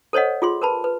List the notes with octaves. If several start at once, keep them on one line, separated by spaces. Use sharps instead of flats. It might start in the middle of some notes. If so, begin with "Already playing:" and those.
A4 C5 C#5 D#5 F#5
F4 G#4 C6
A#4 B4 A5 B5
B4